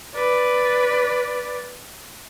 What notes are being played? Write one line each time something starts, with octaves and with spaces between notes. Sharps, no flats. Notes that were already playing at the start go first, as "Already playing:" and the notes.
B4 D5